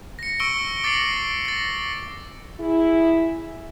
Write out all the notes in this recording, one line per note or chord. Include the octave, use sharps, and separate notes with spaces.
A#6 C#7
C#6 E6 C#7 D7 G7
D6 A6 A#6 C7 D7 F#7
A6 A#6
E4 G#4